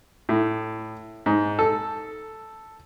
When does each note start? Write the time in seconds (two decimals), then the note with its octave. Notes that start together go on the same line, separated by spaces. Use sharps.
0.29 A2
1.26 G#2
1.59 A4